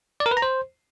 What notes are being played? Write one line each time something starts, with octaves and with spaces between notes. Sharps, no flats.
D5
A#4
B4
A#5
C5